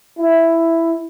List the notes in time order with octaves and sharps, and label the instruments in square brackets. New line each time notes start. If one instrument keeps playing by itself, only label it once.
[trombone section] E4